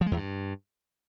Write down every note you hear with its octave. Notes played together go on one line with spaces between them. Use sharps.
F3
G#3
E2
G2